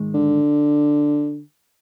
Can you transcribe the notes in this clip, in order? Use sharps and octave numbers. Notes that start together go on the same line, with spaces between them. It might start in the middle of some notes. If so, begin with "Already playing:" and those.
Already playing: G#2 D#3 G#3
D3